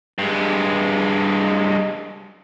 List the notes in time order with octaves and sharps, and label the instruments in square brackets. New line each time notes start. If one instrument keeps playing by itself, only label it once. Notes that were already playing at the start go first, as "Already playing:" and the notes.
[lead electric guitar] G2 G#3